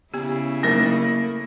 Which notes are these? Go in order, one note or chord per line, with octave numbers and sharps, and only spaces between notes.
C#3 B3 E4 G4
F#3 A3 A#3 A#4 A#6